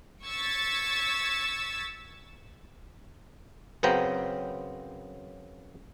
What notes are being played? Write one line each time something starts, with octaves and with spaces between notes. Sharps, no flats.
C#6 E6 G#6 A6 B6
F#2 C#3 B3 C4 G5 A#5